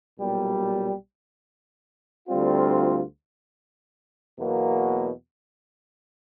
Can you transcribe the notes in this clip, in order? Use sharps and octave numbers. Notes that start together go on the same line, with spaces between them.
B1 A#2 G3
D2 D3 G3 C4 F4
E2 B2 F#3 A#3